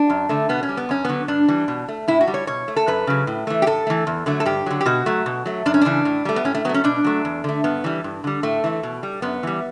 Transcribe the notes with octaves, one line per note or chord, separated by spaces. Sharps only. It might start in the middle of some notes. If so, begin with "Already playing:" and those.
Already playing: D4
F#2
D3 A3
B2 B3
C#4
G3
B3
F#2 C#4
D3 F#3 B3
G2 D4
E3 G3
B2
A3
A2 E4
F#4
G3
C#5
B2 C#5
A3
A4
F#2 B4
C#3 F#3
A2
E3 A3
G4
A2 A4
E3 A3
E2
D3 F#3 A3
A4
G2 G4
D3 F#3
G4
B2 F#4
F#3 A3
B2
F#3 A3
F#2 D4
C#4
C#3 E3 D4
A2
G3 A3
B3
A2 C#4
A3
F#3 A3 B3
C#4
B2 D4
F#3 A3
E2
D3 A3
G2 B3
E3 G3
G2
D3 G3
A2 A3
E3 A3
B2
G3
F#2 B3
E3 G3